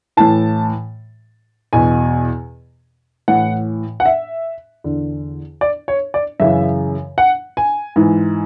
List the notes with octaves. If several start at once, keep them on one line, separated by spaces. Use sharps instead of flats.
A2 E3 A5
E2 B2 G#5
A2 E3 F#5
F#5
E5
E2 D3
D5
C#5
D5
F#2 C#3 E3 E5
F#5
G#5
G#2 E3